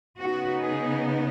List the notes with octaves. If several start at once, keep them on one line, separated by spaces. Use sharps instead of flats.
C#3 B3 D#4 F#4
G#4